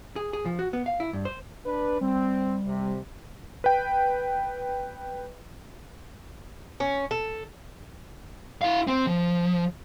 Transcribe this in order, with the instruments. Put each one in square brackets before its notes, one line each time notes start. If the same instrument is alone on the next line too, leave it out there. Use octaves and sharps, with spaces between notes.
[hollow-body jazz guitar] G#4
G#4
F3
F#4
B3
F5
E4
G2
C5
[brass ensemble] D4 B4
[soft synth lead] G3 [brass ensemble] C4
[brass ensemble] C3
[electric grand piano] B4 G5
[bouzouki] C#4
A4
[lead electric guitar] E4 F5
C4
F3